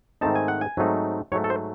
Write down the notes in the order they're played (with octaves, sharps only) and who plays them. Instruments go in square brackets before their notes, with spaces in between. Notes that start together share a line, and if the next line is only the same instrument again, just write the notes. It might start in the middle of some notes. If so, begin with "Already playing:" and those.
[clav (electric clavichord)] G#2 D#3 A3 C4 D#4 A5
G#5
F#5
G#5
G#2 F#3 A3 C4 D#4
G#2 F#3 A3 C#5
A4
C5